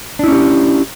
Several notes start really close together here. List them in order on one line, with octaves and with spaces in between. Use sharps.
D4 E4 C#4 G4